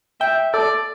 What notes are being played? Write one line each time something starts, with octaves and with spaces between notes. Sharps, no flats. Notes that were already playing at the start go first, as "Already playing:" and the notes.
E5 G5
A4 D5